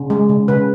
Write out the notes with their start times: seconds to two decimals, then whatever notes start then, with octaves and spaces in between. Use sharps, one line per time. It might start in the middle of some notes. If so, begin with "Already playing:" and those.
Already playing: C#3
0.10 G#3
0.29 C#3
0.48 C#3 B4